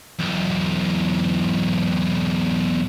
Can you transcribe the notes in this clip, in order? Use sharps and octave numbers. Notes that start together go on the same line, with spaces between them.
B1 E2